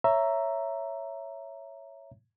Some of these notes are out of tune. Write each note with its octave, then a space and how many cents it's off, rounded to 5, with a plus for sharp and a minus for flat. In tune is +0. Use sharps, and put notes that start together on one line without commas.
C#5 +0 E5 +10 A#5 +0